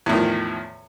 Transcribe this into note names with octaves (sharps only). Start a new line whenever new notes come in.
E2 A2 D#3 F3